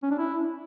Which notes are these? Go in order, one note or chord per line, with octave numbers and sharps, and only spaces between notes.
C#4
D4
E4